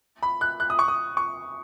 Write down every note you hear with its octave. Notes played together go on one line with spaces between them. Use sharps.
B5
F#6
F#6
D#6
C#6
D#6
C#6